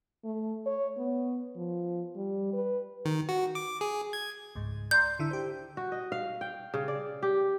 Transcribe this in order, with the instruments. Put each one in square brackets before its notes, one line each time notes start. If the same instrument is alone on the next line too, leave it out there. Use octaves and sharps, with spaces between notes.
[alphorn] A3
C#5
B3
F3
G3
B4
[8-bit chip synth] D#3
F#4
D6
G#4
G#6
[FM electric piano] C#2 G#2
[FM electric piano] D5 A#5 C6 [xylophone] G6
[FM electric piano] D3 E4 E6
G4 C5
[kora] F#4
D#5
F5
G5
C#3
D5
G4